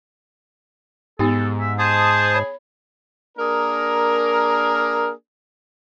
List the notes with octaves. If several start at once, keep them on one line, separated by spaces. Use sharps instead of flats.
G#2 B3 D#4 G4 A4
E5
G#4 C5 A5 D#6
C#5 B5
A#3 D4 G#4 A#4